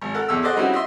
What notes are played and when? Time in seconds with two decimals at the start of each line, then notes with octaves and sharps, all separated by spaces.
0.02 G#1
0.14 A4 A#4 F#5
0.28 E2 E6
0.42 G#4 A4 C5 D5 D#5 F#5
0.56 G3 C4 C#4 D#4 E4 F#4
0.73 D#5 E5 C6